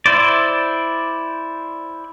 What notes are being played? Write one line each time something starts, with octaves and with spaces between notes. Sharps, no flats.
E4 C5 D5